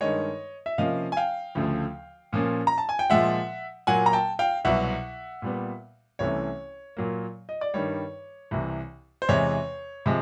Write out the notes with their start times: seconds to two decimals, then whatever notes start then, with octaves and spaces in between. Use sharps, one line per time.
0.01 G2 D#3 G#3 C#5 D#5
0.66 E5
0.78 C3 F3 A#3 C#4 D#5 F5
1.12 G#5
1.17 F5 G5
1.55 D2 C#3 F3 A3
2.33 A#2 F3 A#3 C#4
2.67 A#5
2.78 A5
2.89 G#5
2.99 G5
3.10 A#2 F3 G#3 E5 F#5
3.87 A#2 F#3 A#3 F#5 G#5
4.06 A#5
4.13 G5 A5
4.39 F5 G5
4.65 C2 B2 F#3 E5 F#5
5.42 A#2 G3 B3
6.19 C2 C3 E3 A3 C#4 C#5
6.97 A#2 F#3 A#3
7.49 D#5
7.61 D5
7.74 G2 D#3 G3 C#5
8.51 C2 C3 E3
9.22 C5
9.29 E2 C3 E3 G#3 C#5
10.06 C3 F3 G#3